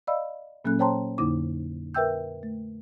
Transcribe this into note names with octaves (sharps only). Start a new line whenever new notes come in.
D5 D#5 F5 B5 E6
A#2 F#3 A#3 C#4 A4 F#6
C5 C#5 G5 A5 A#5 C6
F2 D3 A#3 D#4 E4 D6
A#4 B4 E5 G5 E6 G6
A3